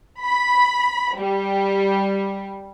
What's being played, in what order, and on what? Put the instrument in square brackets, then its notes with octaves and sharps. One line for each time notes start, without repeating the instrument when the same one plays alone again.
[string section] B5
G3